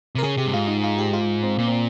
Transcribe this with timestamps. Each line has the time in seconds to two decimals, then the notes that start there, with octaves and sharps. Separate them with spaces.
0.15 C3
0.18 A#4
0.23 C#3 G#4
0.37 C3 G4
0.46 G2
0.53 G#2 F4
0.68 D#4
0.84 F4
0.98 G4
1.13 F4
1.43 C4
1.58 A#2 A#3
1.68 C4